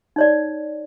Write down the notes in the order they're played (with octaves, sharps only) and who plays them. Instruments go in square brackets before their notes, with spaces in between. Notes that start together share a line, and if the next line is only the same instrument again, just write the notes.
[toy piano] D#4 C#5 D5